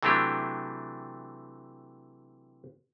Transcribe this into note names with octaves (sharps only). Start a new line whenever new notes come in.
C3 E3 F#3 A3 D4 G4